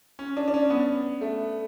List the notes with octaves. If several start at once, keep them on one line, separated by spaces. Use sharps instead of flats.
C#4
D4
D4
C#4
B3
A3